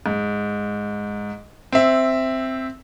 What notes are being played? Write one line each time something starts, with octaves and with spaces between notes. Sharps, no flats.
G#2
C4 E5